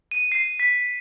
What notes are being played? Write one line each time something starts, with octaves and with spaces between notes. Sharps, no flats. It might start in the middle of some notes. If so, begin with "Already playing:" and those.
D#7
C7
B6